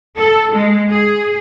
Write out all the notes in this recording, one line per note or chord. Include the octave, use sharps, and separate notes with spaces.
A4
G#3
G#4